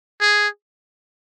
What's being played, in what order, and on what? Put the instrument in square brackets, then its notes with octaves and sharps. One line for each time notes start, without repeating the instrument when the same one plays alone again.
[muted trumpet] G#4